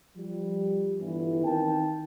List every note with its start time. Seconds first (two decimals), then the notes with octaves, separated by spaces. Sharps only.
0.16 F3 G3
0.99 G1 E3
1.43 D#3 C4 A#4 G5 A5